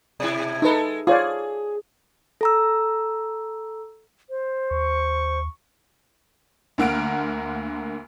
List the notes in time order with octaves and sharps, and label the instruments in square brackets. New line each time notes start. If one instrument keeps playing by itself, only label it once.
[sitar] B2 E4
[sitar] G#3 A4 [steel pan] D#4 B4
[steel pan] F4 C#5 D5 [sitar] G#4
[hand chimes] A4 A#5 E6
[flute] C5
[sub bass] D#2 [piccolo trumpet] C#6
[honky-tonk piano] D2 D3 A#3 F#5 F6 D7